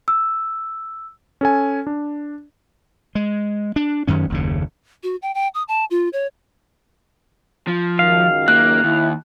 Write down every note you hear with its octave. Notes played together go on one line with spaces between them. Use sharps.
E6
C#4 A4 G#5
D4
G#3
D4
F#2 D#3 C#4
F#1 D#2 C#3
F#4
G5
G5
D#6
A5
F4
C#5
F3
C#2 F#2 D#3 F5
A#3 F#6
D#2 E4